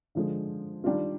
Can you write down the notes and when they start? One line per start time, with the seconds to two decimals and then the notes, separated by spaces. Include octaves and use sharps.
0.15 D3 F3 G#3
0.84 D#3 G3 D4 F4